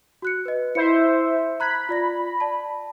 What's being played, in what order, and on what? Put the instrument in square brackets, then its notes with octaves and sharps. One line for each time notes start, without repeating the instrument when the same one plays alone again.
[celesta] F#4 F#6 C#7
B4 D#5
[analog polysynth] E4 C5 E5 [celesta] C#7
[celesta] A#5 F#6 G#6 [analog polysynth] B5
[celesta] F4 D5 A#6
D5 A5